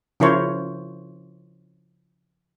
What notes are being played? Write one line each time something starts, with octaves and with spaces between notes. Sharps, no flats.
C#3 F3 E4 A#4 C5 C#5